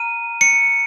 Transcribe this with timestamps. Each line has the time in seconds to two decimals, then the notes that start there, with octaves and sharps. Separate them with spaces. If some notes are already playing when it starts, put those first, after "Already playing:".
Already playing: A#5 F6 D#7
0.41 C#7